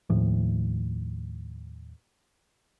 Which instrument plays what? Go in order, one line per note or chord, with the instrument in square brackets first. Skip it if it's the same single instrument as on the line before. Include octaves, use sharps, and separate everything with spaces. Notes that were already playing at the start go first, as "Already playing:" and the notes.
[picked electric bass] D#2 A2 F3